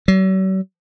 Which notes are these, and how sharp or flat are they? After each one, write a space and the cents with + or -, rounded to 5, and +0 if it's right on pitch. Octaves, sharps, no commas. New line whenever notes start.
F#3 +45